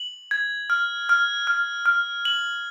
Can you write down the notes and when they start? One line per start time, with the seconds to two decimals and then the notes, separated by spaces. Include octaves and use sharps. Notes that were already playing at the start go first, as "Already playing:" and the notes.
Already playing: F#7
0.31 G#6
0.70 F6
1.09 F6
1.47 F6
1.86 F6
2.25 F#7